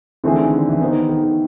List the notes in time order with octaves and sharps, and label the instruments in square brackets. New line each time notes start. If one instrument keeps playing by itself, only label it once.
[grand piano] D3 [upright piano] E3 A3 C4 E4 G#4
[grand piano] D#3
D3
E3
[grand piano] D#3 [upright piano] B3 D#4 G4 C5
[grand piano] D#3
D#3